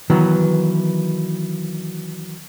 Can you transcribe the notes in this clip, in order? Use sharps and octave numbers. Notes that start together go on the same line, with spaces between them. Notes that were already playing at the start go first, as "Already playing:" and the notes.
D#3 E3 F#3 B3